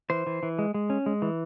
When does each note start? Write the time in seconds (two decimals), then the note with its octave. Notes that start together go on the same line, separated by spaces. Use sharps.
0.10 E3 C5
0.27 E3
0.43 E3
0.59 G#3
0.74 G#3
0.90 C#4
1.06 G#3
1.22 E3